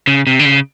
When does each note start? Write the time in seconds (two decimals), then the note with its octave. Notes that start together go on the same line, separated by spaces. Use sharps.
0.07 C#3
0.27 C3
0.39 D3
0.45 C#3